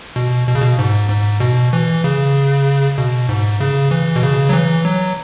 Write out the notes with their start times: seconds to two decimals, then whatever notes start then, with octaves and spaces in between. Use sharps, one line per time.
0.16 B2
0.47 B2
0.55 C#3
0.62 B2
0.79 G#2
1.09 G#2
1.40 B2
1.73 E3
2.04 C#3
2.98 B2
3.29 G#2
3.60 C#3
3.91 E3
4.16 B2
4.23 C#3
4.49 F#3
4.53 E3
4.85 F#3